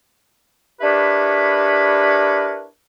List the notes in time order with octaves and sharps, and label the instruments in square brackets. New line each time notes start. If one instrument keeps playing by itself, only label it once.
[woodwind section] D4 E4 G4 A#4 B4 C#5